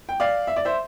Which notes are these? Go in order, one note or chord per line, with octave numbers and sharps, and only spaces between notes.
G5
D5 F5
E5
D5
C5 E5